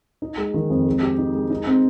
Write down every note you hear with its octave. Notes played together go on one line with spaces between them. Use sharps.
D#4
G#3
D#3
F2
G#3
G4
D#4
G#3
D#4
C4